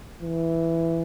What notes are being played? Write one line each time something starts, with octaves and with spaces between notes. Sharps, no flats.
E3